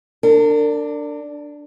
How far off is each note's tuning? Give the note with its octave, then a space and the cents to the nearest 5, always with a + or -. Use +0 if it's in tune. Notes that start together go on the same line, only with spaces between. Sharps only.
D4 +0 A#4 -40